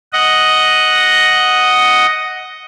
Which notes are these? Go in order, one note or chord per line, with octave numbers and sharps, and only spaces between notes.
D#5 F#5